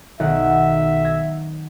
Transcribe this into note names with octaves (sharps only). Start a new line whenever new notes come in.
B1 D#3 E5 F#5
G#6 A#6